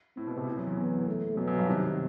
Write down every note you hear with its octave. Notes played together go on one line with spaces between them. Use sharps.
A2 C4
B2
C3
A2
F#2
E2
B3
A3
F#2 B2
F#2
G2
C3 D#3